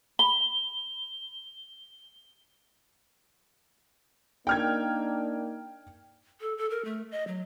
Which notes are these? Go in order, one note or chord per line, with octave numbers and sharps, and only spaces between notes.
B5 G7
A#3 D4 D#4 G5 F6 G#6
A4
A4
A#4
A3
D#5
F#3